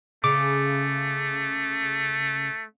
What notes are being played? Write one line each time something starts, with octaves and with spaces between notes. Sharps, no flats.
C#3 A3 D6